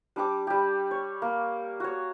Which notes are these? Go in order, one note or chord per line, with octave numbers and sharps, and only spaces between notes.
G3 D4 G4 D6
G3 G4
C#5
A#3
F#4 C#5